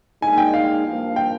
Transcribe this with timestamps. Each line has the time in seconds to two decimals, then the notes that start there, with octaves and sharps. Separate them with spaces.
0.22 A#2 G#3 D#4 G#5
0.38 G5
0.54 F5
0.85 G2 F3 A#3
1.16 G5